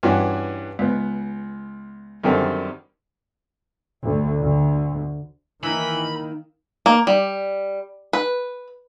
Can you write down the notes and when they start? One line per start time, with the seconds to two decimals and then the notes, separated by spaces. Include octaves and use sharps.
0.03 G2 E3 C#4 F#4
0.79 C#2 B3
2.24 F#2 D3 D#3 G3 C4
4.05 D2
4.42 D2
5.64 D#3 E3 A#3 D#4 E4 B5
6.86 A#3
7.07 G3
8.13 B4